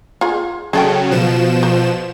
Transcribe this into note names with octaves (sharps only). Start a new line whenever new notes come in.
F4 G#4
C#3 F#3 G#4 A4 G5
B2 F3 E7
C5